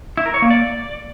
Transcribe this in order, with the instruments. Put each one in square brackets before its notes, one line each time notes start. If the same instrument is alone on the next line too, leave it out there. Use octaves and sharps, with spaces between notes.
[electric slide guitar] E4
A#4
C#5
A#3
D5